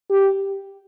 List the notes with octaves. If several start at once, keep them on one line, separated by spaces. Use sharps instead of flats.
G4